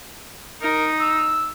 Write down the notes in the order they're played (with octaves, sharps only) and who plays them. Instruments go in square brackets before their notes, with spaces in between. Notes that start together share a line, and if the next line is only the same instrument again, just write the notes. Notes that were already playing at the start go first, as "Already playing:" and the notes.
[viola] D#4 [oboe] A#4
[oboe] E6